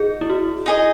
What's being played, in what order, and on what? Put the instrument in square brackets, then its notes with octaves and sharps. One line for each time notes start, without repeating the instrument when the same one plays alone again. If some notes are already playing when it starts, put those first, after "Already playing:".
Already playing: [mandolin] D#4 [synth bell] G#4
[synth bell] E4
F#4
[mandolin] D#4 G#4 D#5